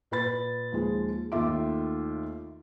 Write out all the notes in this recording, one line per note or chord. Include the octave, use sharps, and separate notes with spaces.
A#2 B4 B5 A6
D#2 F3 G#3
D#2 D#3 A3 F4 E5 D6